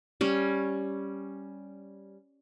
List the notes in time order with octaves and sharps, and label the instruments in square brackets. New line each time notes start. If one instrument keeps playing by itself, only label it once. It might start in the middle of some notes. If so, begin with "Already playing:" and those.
[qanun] G3 C#4